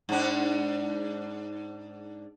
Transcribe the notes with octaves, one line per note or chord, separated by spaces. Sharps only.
G#2 D4